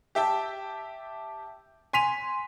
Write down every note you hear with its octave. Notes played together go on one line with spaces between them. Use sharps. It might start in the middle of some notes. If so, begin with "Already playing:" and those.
G4 E5 G5 A5
G#5 C6 B6 D#7 F7